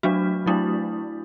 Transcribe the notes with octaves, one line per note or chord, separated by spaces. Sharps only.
F#3 A3 D4 F#4
F#3 A3 D4 E4